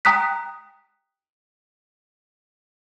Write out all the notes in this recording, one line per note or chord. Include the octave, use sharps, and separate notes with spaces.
G5 A#5 D#6 F#6 B6